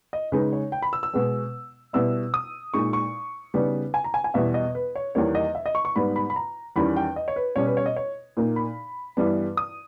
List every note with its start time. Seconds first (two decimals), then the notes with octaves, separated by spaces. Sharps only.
0.13 D#5
0.32 C#3 G#3 D#4 B4
0.53 C#5
0.72 G5
0.82 B5
0.93 E6
1.03 E6
1.14 B2 G#3 B3
1.93 B2 G3 B3 E4 E6
2.34 D#6
2.74 A#2 G#3 D#4 C#6
2.93 C#6
3.54 C#3 G3 B3 D#4
3.94 G#5
4.04 A#5
4.14 G#5
4.24 G#5
4.34 E2 B2 G3 E5
4.54 D#5
4.75 B4
4.95 C#5
5.15 E2 D#3 G3 A#3 C#5
5.35 D#5
5.55 E5
5.66 D#5
5.75 C#6
5.85 C#6
5.96 G#2 G3 B3 B5
6.16 B5
6.30 B5
6.36 A#5
6.76 E2 D#3 G3 C#4 B5
6.97 G5
7.16 D#5
7.28 C#5
7.36 B4
7.56 B2 G3 C#4 C#5
7.67 B4
7.77 C#5
7.86 D#5
7.96 C#5
8.37 A#2 A#3 D#4
8.56 B5
9.17 G2 E3 G3 B3
9.57 D#6